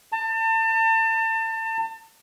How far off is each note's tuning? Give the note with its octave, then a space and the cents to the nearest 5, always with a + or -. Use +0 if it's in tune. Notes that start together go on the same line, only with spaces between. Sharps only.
A5 +35